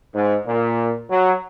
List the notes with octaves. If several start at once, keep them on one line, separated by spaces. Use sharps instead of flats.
G#2
A#2
F#3